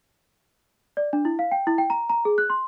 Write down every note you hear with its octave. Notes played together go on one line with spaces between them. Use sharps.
D5
D4
E4
F5
G5
E4
G5
A#5
A#5
G#4
F#6
C6